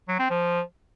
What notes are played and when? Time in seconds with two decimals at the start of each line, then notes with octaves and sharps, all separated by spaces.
0.08 F#3
0.19 C4
0.30 F3